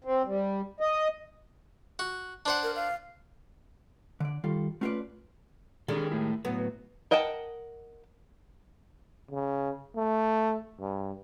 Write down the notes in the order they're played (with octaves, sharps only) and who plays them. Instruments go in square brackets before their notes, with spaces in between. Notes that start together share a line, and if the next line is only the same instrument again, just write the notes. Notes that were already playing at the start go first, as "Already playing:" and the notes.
[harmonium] C4
G3
D#5
[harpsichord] F#4
D4 C5 F#5
[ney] A#4
F5
[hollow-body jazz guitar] D3 D5
D#3 G3 F4 A4
A3 C#4 F4 A4 B4 D5
[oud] D#3 G3 G#3 [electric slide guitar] D4 G#4 A4
[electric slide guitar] A3 E4
[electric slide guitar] A2 F#3 [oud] B3
[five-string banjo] A#4 D#5 F#5 G5 A5
[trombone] C#3
A3
G2